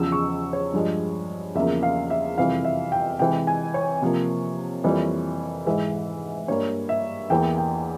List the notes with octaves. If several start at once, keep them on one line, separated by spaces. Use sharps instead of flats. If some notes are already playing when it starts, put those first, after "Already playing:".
Already playing: E2 C#3 F3 E6
C#6
C#5
G2 F3 G#3
E2 C#3 F3 A#3 E5
F5
E5
F2 C3 E3 G3 F5
E5
G5
C3 E3 G#3 G5
G#5
C#5
C3 F3 A#3
F2 E3 G3 A#3
G#2 E3 G#3 E5
G2 G3 A#3 C#5
E5
E2 E3 A#3 G5
G5